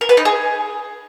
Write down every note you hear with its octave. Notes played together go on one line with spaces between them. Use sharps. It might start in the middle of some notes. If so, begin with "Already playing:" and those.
A#4
B4
D#4
G#4